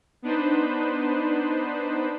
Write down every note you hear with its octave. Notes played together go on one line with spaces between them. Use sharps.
B3 D4 D#4 B4 C5